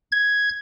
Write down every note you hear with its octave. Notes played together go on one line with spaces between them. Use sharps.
G#6